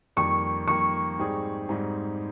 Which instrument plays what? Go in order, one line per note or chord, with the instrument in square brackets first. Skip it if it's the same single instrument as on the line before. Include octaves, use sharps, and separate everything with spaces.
[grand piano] F2 D#3 G3 A#3 [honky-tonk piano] C#6
[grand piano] F2 D#3 G3 A#3 [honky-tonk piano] C#6
[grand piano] G#2 G3 C4 D#4 G#4
G#2 G3 C4 D#4 G#4